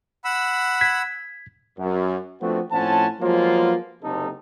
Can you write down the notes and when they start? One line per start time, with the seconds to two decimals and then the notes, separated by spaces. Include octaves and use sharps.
0.25 F#5 B5 E6
0.81 G#6 B6
1.77 F#2
2.40 F3 A3 B3 C4 D4 F#4
2.71 A2 F3 C4 C#4 F#5 A5
3.20 F3 F#3 G#3 A#3 B3 F4
4.02 F#1 C3 D#4 A4